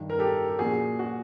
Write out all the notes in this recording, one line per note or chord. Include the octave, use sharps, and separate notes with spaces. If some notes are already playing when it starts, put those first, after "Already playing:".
Already playing: G2 D#3
A#4
G4 A4
G4
A#2 F3 F#4 G#4
F#4